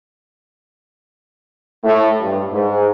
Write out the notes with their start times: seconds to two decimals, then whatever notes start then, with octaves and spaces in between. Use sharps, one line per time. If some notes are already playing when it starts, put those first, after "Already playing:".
1.84 A2
2.20 G2
2.51 G#2